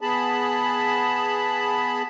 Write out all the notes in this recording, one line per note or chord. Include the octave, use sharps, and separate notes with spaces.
B3 G#4 A5 B5